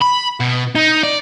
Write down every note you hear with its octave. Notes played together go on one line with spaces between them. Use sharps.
B5
B2
D#4
D5